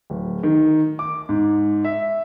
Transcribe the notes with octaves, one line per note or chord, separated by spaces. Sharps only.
D1
D#3
D6
G#2
E5